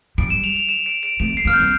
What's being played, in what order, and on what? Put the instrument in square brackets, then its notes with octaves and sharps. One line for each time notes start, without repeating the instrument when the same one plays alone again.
[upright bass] G3 [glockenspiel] D7
[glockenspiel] E7
F7
F7
E7
D7
D7
[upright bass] A3 [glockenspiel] D7
[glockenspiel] C7
[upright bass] A#3 [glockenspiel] F6
[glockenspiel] G6
[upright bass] G3